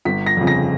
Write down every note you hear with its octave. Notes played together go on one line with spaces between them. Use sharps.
G1 B6
A#6
F2 C#3
A#6